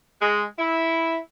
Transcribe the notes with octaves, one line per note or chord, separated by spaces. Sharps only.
G#3
E4